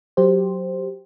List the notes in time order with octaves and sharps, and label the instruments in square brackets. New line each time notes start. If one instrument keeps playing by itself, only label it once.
[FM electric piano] F#3 G4 C5